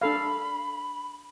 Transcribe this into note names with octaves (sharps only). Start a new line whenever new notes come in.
D4 A4 F5 B5